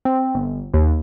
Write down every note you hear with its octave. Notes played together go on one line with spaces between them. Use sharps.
C4
G1
D#2